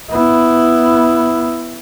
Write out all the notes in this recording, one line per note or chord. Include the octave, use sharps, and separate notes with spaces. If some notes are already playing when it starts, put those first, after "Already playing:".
B3 E4